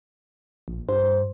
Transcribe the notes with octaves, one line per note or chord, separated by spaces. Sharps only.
A#1
G2 C5